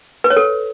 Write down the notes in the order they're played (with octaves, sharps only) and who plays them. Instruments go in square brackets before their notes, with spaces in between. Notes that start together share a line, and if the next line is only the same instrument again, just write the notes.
[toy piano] B4
C#5
A4